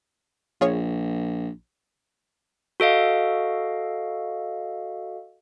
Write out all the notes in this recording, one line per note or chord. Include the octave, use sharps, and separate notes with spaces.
A#1 F4 G#4 C#5
F#4 A4 D#5 F5